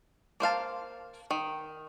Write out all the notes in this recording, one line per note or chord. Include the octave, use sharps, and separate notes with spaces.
A#3 C5 F5 A5
D#3